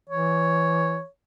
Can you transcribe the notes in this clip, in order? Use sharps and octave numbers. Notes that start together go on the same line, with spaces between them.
E3 C#5